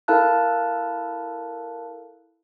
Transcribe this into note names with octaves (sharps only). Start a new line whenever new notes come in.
E4 A4 A#4 F5 A5 F#6